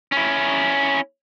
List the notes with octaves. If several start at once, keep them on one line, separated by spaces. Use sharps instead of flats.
C#4 E4